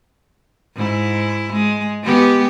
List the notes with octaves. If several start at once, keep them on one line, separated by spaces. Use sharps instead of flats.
G#2 E4
G#3
G#3 B3 G4